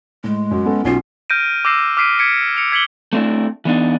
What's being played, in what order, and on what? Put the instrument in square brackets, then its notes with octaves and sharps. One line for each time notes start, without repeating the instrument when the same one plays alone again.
[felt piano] A2 [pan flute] G#3
[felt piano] F#2
B3 C#4 A4
[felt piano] B1 C#4 C7 [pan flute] F4
[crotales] F6 G6 A#6 D7 D#7
D6 E6 G6 A#6 C7 E7
D6 F6 B6 C7 D7 D#7
G#6 B6 C#7 D7
C#7 D7 F7
G#6 B6 C#7 F#7 G7
[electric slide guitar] A3 C4 D4 E4
E3 B3 D4 D#4